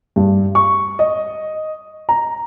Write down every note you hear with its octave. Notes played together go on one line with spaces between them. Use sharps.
G2
C#6
D#5
A#5